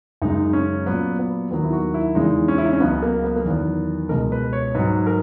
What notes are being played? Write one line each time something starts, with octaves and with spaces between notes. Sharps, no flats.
F#2 C#3 G#3 D#4
C#4
A#2 F#3 B3
B3
D#2 D#3 F#3 B3
E4
F#4
E4
E2 C#3 E3 G#3 D#4
C#4
E4
D#4
C#4
C#2 C#3 F#3 B3
A#3
B3
A#3
E2 D#3 F#3 B3
C#2 B2 G#3 A#4
B4
C#5
G#2 F#3 B4
A#4